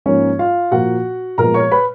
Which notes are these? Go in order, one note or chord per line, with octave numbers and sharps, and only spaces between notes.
G#2 F3 A#3 C#4 C#5
F4 F5
A#2 F3 A#3 F#4 F#5
A#2 F3 G#3 B3 A#4 A#5
C#5 C#6
B4 B5